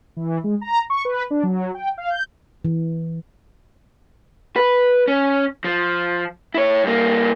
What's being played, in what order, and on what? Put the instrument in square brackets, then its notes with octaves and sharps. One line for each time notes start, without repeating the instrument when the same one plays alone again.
[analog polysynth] E3
G#3
A#5
C#6
B4
D4
F#3
G5
F5
G6
[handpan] E3
[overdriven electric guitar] B4
C#4
F3
E4 C#5
G2 A#3